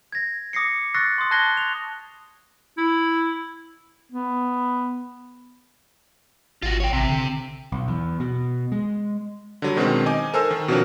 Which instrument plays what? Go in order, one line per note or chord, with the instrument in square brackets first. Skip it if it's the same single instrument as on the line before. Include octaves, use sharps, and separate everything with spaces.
[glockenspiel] G#6 A#6
D6 D#6 A#6 C7 C#7
C#6 E6 F#6 A6 A#6 C7
C6 D#6
A5 F#6 G#6 A#6 C7 G7
F7
[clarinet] E4
[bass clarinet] B3
[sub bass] G#1 [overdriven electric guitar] F4 F#4
[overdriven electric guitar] C#5 G5
[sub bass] A1 [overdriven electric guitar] C3
[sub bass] D3
[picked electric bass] B1
E2
B2
G#3
[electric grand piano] D3 F#3 G3
B2 D#3 G#3 C4 D4 F#4
D#4 D#5 G#5 D6
A4 A#4 C5 G#5 E6
D#3
B2 F3 F#3 C4 D4 A#4